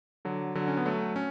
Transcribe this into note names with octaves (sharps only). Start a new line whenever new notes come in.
D3 F#3
D3 F#3
C#4
B3
F#3 A3
C#4